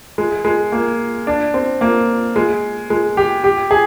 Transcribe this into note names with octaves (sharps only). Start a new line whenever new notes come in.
G#3
G#3
A#3
D4
C4
A#3
G#3
G#3
G4
G4
G#4